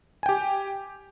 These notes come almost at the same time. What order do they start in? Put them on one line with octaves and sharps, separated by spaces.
G#5 G5 G4